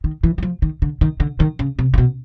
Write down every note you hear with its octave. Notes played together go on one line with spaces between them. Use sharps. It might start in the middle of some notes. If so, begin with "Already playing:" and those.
D#3
E3
F#3
F3
D#3
D3
D#3
D3
D#3
C#3
C3
C3
B2